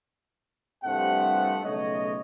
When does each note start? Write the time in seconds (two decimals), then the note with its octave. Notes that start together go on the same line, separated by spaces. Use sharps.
0.84 C2 G2 C3 F3 A3 F#5
1.63 B1 C#3 A3 C#5 D#5